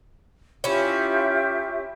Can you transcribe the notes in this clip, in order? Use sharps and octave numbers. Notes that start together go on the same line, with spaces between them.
C#4 E4 F4 G4 E5